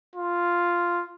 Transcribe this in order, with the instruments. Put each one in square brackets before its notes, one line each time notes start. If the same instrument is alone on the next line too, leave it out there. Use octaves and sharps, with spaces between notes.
[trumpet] F4